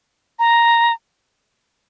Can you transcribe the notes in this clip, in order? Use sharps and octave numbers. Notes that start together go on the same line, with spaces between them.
A#5